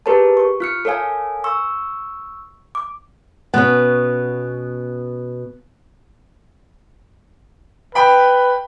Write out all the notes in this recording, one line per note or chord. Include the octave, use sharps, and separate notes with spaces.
G4 G#4 A#4 B4 C#5 A5
C#6
F4 F6 C#7
A4 A#4 C#5 F5 G#5
C#6 E6
D6
B2 B3 C#4
B4 G5 B5